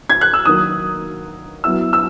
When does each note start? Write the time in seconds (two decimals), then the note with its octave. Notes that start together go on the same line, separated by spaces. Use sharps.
0.10 G#6
0.21 F#6
0.34 E6
0.45 D#3 F#3 A#3 D#6
1.64 F#3 B3 E4 E6
1.93 E6